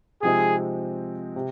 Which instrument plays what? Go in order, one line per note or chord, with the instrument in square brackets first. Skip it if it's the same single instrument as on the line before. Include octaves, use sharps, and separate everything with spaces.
[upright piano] C3 F3 G#3 C4 D#4 [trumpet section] G#4
[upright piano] C3